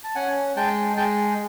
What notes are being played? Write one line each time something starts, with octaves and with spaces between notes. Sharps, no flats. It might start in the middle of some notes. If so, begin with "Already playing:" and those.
A5
C#4 F#5 G#5
G#3 G5 A5
G#3 G5 A5